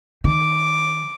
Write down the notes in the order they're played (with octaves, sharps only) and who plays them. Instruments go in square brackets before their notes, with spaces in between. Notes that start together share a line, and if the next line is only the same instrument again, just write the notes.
[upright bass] D#3 [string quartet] D6